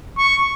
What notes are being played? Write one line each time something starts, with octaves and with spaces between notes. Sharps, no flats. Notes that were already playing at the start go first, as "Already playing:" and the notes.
C#6